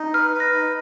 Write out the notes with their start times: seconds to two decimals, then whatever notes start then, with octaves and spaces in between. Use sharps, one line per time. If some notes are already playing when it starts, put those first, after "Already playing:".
Already playing: D#4
0.14 B4 F6
0.34 B4
0.40 A#6
0.54 D#4